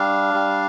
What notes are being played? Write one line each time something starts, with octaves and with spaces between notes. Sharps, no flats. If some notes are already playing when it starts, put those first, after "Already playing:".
Already playing: G3 D4 F5
G3